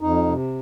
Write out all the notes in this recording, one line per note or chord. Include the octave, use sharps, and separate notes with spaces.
F2 D#4
C3